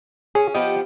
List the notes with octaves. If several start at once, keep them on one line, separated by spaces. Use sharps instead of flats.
C#4 G#4
F3 B3 G4 D#5